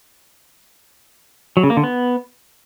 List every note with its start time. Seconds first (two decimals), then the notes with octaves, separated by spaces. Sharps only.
1.57 F#3
1.63 C#3
1.70 A#3
1.77 D3
1.84 B3